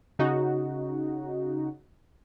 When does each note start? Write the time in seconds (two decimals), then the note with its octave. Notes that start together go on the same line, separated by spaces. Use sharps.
0.19 C#3 D#4 F#4